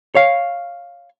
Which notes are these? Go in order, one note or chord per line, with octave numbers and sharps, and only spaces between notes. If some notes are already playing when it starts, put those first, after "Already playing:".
C#5 F5